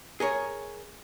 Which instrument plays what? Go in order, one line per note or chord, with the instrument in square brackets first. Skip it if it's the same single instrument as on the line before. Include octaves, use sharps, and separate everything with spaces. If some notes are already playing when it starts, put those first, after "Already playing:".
[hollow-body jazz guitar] G#4 A#4 C#5